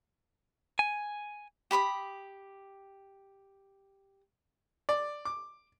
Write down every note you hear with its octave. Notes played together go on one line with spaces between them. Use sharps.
G#5
G4 B5 C#6 D#6
D5
D6